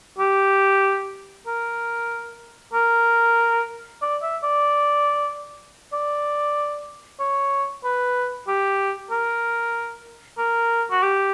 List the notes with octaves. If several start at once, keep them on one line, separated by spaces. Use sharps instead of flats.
G4
A#4
A#4
D5
E5
D5
D5
C#5
B4
G4
A#4
A#4
F#4
G4